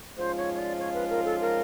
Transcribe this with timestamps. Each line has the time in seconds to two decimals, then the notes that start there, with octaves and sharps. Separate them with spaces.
0.17 G#2 F3 G#3 C#4 F4 C5
0.37 C#5
0.54 C#5
0.58 D5
0.79 C#5
0.94 B4
1.10 A#4
1.25 A4
1.40 A#4